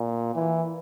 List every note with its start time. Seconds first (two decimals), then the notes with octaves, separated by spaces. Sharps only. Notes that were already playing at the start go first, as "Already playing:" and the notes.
Already playing: A#2
0.35 E3